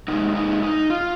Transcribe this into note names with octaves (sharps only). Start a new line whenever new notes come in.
C3 G#3 D#4
D#4
D#4
F4